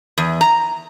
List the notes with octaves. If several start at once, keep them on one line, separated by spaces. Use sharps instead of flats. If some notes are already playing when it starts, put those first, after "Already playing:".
E2
A#5